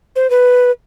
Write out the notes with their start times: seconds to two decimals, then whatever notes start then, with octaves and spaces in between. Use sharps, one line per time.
0.16 C5
0.30 B4